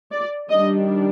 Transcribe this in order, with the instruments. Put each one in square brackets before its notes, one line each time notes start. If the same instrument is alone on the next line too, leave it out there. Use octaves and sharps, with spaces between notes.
[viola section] D5
D#3 G3 D4 D#5